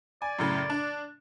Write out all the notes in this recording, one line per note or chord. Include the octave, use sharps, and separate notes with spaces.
D5 G#5
F#2 A2 C#3
D4